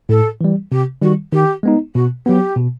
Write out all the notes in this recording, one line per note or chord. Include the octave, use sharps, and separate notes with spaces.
A2 A4
E3 G3
C3 G4
D#3 G3 F#4
D#3 G4
G#3 B3 D#4
B2 F#4
F#3 B3 G4
B2